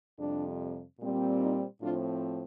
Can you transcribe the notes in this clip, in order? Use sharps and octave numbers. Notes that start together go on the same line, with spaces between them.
F2 C3 G3 D4
A#2 G3 C4
D#4
A2 F3 C4 D4 F4